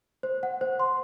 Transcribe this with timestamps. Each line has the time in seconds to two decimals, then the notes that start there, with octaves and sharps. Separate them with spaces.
0.23 C5
0.43 F#5
0.61 C5
0.80 C6